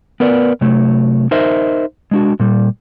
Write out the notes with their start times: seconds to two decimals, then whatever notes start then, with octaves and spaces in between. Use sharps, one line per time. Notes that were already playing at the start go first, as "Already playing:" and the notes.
0.20 B3 A#4 B4 D5
0.61 C3 F#3 A3
1.31 D#4 A#4 C5 D#5 E5
2.11 G#3 D4 F#4
2.40 A#2 G3